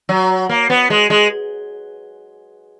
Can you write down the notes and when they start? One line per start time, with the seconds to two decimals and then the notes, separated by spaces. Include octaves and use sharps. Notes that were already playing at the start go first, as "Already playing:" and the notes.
0.09 F#3
0.49 A#3
0.70 B3
0.90 G#3
1.10 G#3